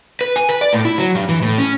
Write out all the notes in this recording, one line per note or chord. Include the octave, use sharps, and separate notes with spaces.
B4
G#5
B4
D5
A2
E4
F#3
G2
E3
A2
C#4